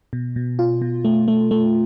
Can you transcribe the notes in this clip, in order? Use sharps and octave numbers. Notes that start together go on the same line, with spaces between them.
B2
B2
F4
B2
A3
A3
A3